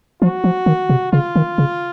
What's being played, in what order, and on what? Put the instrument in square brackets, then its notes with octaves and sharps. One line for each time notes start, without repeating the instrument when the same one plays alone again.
[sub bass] F3 [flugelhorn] F#4
[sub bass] F3
D#3
C3
[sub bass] C#3 [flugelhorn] F4
[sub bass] D#3
C#3